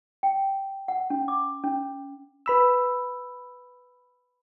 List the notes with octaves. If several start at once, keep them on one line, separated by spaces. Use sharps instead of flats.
G5
F#5
C#4
D6
C#4
B4 B5 E6